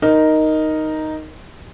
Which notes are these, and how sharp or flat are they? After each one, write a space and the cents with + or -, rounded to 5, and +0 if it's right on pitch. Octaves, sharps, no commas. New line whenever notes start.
D#4 +0 A#4 +0